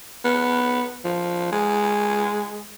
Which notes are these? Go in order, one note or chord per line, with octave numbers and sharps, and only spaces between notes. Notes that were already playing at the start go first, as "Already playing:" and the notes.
B3
F3
G#3